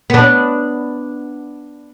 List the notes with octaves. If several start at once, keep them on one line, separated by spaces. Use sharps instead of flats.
B3 D4